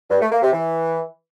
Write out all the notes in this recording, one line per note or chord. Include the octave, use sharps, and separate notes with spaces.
G2
A3
A#3
C3
E3